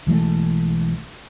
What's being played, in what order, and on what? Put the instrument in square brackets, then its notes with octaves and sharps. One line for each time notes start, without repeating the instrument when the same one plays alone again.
[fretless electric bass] B1 E3 G#3 A3